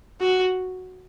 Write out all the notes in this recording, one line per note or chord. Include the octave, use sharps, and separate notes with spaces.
F#4